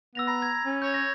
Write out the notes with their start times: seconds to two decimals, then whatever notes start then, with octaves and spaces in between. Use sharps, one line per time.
0.15 B3 E6 A#6 F7
0.27 A#5 B5
0.42 G#6
0.66 C#4
0.82 C#5 G6
0.94 A#6